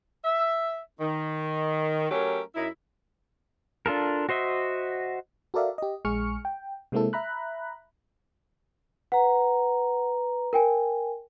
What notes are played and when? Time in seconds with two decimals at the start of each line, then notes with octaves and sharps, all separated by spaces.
0.24 E5
1.00 D#3
2.10 F#3 A3 C#4 G4 A#4
2.55 F#2 D#4 E4
3.86 D4 F4 A4 A#4
4.29 F#4 C5 D#5 E5
5.54 F#4 A4 A#4 D5 E5 F5
5.78 G4 D#5
6.05 A#1 G#3 G#4 C#6 F6 C#7
6.45 G5
6.92 C3 G#3 A#3 C4 E4 A4
7.13 E5 A#5 B5 F#6
9.12 B4 F#5 A#5
10.53 A#4 G5 G#5